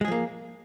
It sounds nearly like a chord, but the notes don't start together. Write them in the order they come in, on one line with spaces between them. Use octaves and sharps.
G#3 G#4 F3 A#3